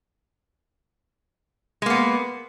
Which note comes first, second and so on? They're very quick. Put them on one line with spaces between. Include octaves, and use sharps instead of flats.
G#3 A#3 B3